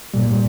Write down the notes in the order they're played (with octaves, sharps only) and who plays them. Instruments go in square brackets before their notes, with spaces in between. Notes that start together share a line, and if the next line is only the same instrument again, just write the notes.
[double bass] A#2 [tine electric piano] G3